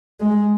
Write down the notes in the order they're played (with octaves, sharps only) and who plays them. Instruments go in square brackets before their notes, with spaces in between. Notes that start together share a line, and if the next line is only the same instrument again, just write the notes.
[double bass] G#3